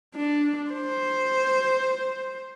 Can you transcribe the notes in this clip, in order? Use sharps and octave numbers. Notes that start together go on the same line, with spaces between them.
D4
C5